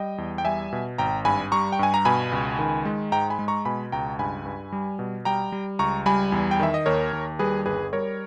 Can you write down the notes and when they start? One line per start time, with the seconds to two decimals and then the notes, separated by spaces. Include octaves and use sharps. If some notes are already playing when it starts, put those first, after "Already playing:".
Already playing: G3 D#5 G5
0.18 E2
0.38 G5
0.45 G3 E5 G#5
0.73 B2
0.98 G#1 G5 A#5
1.25 G2 G#5 B5
1.52 G3 A#5 C#6
1.72 G5
1.79 G2 G#5
1.94 A#5
2.05 B2 G#5 B5
2.32 C#2
2.59 D#3
2.85 G#3
3.12 G#2 G5 A#5
3.30 G#5 B5
3.39 G#3
3.48 A#5 C#6
3.65 B2 G#5 B5
3.92 C#2 G5 A#5
4.19 G2 G#5 B5
4.46 G2
4.72 G3
4.99 B2
5.25 G3 G5 A#5
5.52 G3
5.79 C#2 A#5 C#6
6.06 G3 G#5 B5
6.32 E2
6.51 G5
6.60 D#3 E5
6.74 D#5
6.86 D#2 A#4 C#5
7.13 D#2
7.39 G3 G#4 B4
7.66 G1 G#4 B4
7.93 G3 A#4 C#5